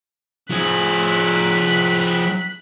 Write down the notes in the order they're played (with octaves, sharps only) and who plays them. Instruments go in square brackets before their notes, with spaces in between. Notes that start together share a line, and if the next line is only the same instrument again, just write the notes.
[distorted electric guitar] F3 G#4 [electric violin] F#6 B6